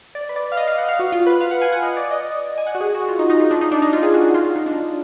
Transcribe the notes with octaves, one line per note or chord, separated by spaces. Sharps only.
D5
B4
D5
F5
D#5
F5
F#5
F5
F#4
F4
B4
F5
F#5
G#5
F#5
D#5
D5
D#5
G#5
F#5
F#4
G#4
F#4
F4
D#4
D#4
F4
D4
D#4
D4
D#4
F4
G#4
F#4
F#4
F4
F4
D#4
D4